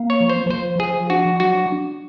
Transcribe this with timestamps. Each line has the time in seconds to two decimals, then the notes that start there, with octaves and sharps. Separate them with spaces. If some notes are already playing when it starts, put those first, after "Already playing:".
Already playing: A#3
0.10 C#5
0.20 F3
0.30 C5
0.50 F3 C5
0.79 F3 G#4
1.10 D4 F#4
1.40 F#3 F#4